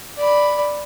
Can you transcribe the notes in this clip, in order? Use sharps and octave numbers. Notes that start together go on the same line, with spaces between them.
D5 B5